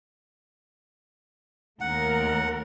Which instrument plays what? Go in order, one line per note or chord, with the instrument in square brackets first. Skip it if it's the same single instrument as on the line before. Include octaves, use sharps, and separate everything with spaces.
[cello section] D#2 A3 A#4 [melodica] F#5